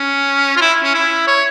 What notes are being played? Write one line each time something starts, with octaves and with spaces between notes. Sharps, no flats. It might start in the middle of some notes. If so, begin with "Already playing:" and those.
Already playing: C#4
F4
E4
C#4
E4
C#5